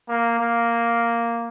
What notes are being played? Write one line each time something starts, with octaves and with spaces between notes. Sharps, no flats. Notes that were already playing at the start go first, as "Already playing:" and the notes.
A#3
A#3